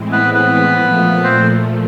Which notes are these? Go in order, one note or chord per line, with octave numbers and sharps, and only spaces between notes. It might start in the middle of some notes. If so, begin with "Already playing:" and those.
Already playing: A2 E3 G#3 C4
B3 B4
B3 B4
A#2 F3 A3
C4 C5